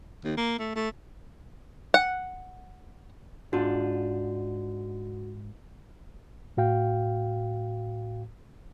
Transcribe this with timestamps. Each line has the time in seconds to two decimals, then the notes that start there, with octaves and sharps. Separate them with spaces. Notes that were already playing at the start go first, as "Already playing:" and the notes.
0.25 D#2
0.37 A#3
0.59 A3
0.76 A3
1.94 F#5
3.53 G#2 D4 F4 F#4
6.57 A2 F#4 F5 G5